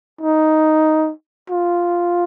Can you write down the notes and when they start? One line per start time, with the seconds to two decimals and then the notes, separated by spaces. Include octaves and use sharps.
0.21 D#4
1.50 F4